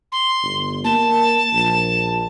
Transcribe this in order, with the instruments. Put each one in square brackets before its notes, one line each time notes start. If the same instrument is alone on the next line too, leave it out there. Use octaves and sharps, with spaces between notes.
[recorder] C6
[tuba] G1
[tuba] A#3 [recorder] A5
[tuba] A#1